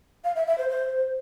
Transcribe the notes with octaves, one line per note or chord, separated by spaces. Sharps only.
F5
E5
E5
C5
C5